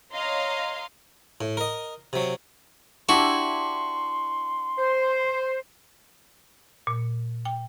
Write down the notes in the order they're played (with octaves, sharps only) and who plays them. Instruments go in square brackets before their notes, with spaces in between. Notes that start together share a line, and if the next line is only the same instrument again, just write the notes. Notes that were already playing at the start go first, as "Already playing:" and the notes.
[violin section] C#5 D#5 F5 A#5 C6
[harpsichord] A2
A#4 D#5
C3 F#3
[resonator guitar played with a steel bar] D4 E4 G4 [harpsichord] F#4 [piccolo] C6
[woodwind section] C5
[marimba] A#2
G5